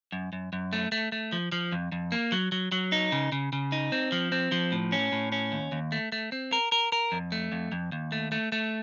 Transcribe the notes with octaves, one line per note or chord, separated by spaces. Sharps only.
F#2
F#2
F#2
A3
A3
A3
F3
F3
F2
F2
A#3
F#3
F#3
F#3
D#4
C#3
C#3
C#3
D#4
C4
F3
C4
F3
A2
C#4
A2
C#4
D#2
D#2
A3
A3
C4
A#4
A#4
A#4
F2
A3
F2
F2
D#2
A3
A3
A3